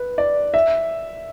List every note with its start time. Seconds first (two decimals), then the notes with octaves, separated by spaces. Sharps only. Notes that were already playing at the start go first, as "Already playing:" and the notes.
Already playing: B4
0.18 D5
0.54 E5